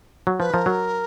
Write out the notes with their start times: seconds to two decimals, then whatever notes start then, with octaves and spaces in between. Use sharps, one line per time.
0.27 F#3
0.40 F3 B4
0.53 F3 A#4
0.66 F#3